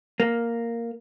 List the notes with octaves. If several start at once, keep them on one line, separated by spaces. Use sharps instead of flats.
A#3